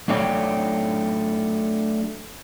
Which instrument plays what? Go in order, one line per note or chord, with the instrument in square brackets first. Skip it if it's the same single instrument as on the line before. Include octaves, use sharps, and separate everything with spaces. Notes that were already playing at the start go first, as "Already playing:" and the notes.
[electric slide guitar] F#3 A3 D4 F4 C#5 G5